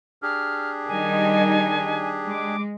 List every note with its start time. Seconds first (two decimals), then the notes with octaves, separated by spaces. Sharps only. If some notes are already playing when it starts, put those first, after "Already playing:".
0.22 D4 G4 G#4 F6
0.88 D#3 G3 D#4 G#5
2.28 G#3 D6